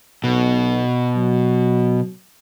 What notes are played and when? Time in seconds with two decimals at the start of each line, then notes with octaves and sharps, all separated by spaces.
0.24 B1 B2
1.16 F#3